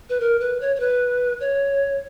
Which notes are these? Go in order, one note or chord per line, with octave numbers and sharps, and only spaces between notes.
B4
A#4
B4
C#5
C#5
B4
C#5